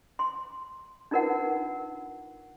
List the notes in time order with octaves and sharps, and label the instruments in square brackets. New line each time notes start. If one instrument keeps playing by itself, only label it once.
[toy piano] C6
D4 D#4 F4 A#4 B4 F#5